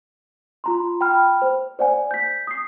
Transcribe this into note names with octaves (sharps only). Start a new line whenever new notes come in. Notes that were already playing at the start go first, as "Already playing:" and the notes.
F4 A#5 C6
G5 B5 F6
C5
C5 D5 F#5 G#5
G6 B6
D#6 C7